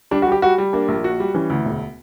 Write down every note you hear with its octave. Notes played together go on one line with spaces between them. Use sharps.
G3 D4
F#4
G3 G4
G3 F#4
G3
A#3 D4
A#1
F#4
G3
E3 C#4
D2
E1